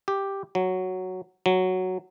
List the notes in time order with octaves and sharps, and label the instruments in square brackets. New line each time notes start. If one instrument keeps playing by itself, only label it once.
[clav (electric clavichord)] G4
F#3
F#3